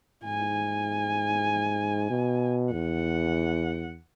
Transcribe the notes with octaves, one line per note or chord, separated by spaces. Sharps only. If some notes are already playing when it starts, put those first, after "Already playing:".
G#2 G#5
B2
E2 F#5